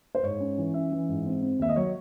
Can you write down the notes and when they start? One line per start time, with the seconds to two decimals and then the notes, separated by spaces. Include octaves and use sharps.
0.15 C5
0.23 G#2 C#5
0.40 C#4
0.58 E3
0.74 C#4 E5
0.92 E3
1.09 G#2
1.26 C4
1.42 C4
1.59 D#2 E5
1.69 D#5
1.76 F#3 C#5